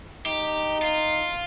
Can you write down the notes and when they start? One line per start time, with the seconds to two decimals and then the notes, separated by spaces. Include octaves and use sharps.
0.26 D#4 G4
0.82 F4